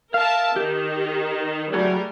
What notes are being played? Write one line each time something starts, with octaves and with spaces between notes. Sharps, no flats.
A#4 E5 F5 A5
D#3 G4
F#3 G3 A3 F#4 G#4 A#4